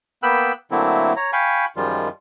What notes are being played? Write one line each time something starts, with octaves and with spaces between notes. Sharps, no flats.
A#3 B3 G5 B5 E6 F#6
D3 F#3 A3 A#3 C4 E4
C#5 A#5
F5 G5 G#5 B5 C#6
F#2 D#3 F3 G3 G#3 F4